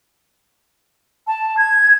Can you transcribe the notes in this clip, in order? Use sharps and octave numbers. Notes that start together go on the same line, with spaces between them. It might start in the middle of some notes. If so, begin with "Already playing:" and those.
A5
G#6